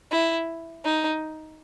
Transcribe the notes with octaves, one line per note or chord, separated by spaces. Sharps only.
E4
D#4